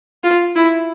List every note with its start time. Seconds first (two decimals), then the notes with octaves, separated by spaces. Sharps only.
0.23 F4
0.55 E4